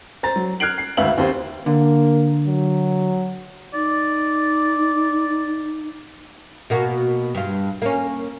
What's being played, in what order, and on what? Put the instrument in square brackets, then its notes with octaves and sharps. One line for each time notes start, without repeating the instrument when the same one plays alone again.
[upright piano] C5 A#5 A6
F#3
F6 F#6 G#6 C7 D7 F#7
C7
G#1 D2 B4 E5 F5 F#7
D#2 C4 G4 C5
[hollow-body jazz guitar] D3 [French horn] A#3
[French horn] F#3
[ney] D#4 [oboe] D5
[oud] B2 A#3 F#4
G2 F4
A#3 C#4